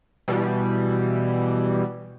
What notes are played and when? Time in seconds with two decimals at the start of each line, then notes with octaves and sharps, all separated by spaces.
0.28 B2 E3 G3